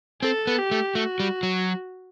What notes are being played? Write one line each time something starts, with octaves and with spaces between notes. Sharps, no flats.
C4 A4
B3
G4
A3
A3 F#4
G3
F#3